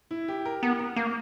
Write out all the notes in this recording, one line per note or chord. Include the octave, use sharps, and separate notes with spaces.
E4
G4
A#4
B3 A#4
A#4
A#3 A#4